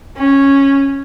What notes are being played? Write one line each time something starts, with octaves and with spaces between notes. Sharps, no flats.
C#4